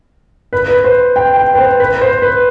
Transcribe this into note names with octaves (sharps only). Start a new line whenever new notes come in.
B4
B4
C5
G5
G5
B4
C5
B4
C5
B4